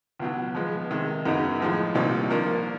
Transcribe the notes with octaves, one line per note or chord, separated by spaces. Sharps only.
C#2 B2 F#3
F3 G#3 B3
C3 D#3 G#3
F#2 C#3 F#3 B3 D#4
A2 F3 G#3
C2 A#2 G3 C4 D#4
F3 A#3 D4 F4 A#4